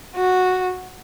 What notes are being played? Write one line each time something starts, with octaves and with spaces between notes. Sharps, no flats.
F#4